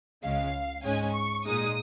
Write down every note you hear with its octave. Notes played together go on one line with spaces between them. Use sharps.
C#2 C#3 G#3 F5
G#2 G#3 C#4 G#5
C#6
A#2 G#3 D#4 D#6